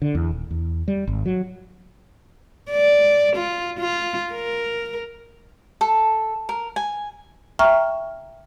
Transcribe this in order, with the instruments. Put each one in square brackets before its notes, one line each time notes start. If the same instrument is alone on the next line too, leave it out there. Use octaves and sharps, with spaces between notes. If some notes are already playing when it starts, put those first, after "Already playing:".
[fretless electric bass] D3
E2
D#1
E2
G3
G#1
F#3
[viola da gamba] D5
F4
F4
A#4
[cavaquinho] A4
A#4
G#5
[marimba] E5 G5 A#5 C#6 F6